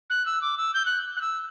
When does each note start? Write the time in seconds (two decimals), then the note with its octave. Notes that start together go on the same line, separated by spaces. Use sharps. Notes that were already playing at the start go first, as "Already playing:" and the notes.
0.10 F#6
0.26 E6
0.42 D6
0.58 E6
0.74 G6
0.86 F#6
1.17 F#6
1.21 E6